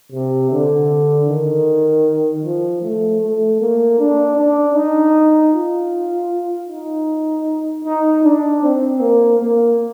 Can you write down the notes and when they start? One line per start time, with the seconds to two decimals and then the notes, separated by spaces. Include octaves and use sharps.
0.12 C3
0.51 D3
1.28 D#3
2.44 F3
2.83 A3
3.22 A3
3.61 A#3
3.99 D4
4.37 D4
4.75 D#4
5.54 F4
6.69 D#4
7.85 D#4
8.23 D4
8.63 C4
9.00 A#3
9.40 A#3